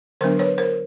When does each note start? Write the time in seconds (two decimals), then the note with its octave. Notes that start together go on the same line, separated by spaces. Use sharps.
0.21 D3 F#3 B3 D4 A#4 C5
0.39 B4 C#5
0.58 A#4 C5